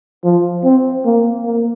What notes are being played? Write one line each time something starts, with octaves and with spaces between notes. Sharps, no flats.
F3
C4
A#3
A#3